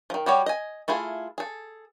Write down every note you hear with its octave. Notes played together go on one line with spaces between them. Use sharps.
D#3 F3
G3 F#4 G4 C#5
D#5 G#5
A3 E4 F4 G#4
G#4 A4